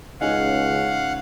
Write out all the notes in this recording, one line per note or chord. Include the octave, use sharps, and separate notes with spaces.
C#2 C#4 D#4 G#4 F5 F#5